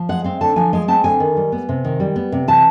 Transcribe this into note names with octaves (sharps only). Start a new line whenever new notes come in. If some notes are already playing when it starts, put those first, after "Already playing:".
Already playing: F3
G#3 F#5
C4 F5
D3 A5
F3 G#5
G#3 G#5
C4 A5
D3 G#5
D#3
G3
B3
C3
D#3
G3
B3
C3
E3 A5